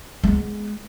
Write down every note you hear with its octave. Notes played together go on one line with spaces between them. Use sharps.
G#3 B3